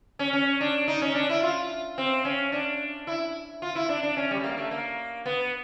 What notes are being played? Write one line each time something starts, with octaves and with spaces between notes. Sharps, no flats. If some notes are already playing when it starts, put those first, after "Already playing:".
C#4
C#4
D4
D#4
C#4
D4
E4
F4
C4
C#4
D4
E4
F4
E4
D4
D4
C#4
G3
A3
A#3
A3
A#3
B3